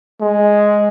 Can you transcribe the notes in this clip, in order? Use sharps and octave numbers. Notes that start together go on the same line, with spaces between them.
G#3